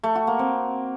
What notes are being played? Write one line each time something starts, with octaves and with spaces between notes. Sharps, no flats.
A3
F#4
A#3
C4